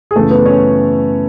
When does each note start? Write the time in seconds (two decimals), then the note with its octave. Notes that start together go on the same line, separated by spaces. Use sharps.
0.11 G#4
0.16 F#2 C#3 E3 A3 A4
0.31 B3 B4
0.45 C#4 C#5